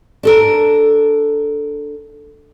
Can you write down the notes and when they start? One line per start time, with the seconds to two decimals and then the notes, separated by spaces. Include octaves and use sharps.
0.23 D4 A4 A#4